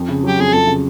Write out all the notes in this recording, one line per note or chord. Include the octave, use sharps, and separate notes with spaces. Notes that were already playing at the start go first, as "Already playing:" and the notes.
Already playing: F2
C#3
F#3 G4
F2 G#4
F2 A4
C#3